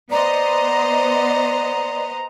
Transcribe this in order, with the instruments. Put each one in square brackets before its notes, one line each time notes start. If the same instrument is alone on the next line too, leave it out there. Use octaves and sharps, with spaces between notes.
[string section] B3 C5 D#5 [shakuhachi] D5 [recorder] A#5